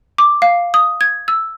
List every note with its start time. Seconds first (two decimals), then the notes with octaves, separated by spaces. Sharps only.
0.18 D6
0.42 F5
0.74 D#6
1.01 G#6
1.28 E6